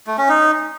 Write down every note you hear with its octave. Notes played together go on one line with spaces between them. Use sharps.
A3
C#4
D#4